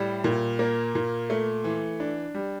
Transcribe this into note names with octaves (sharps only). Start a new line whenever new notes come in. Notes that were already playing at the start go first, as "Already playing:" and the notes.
Already playing: A2 G3
A#2
A#3
A#2
A3
E3
D4
G3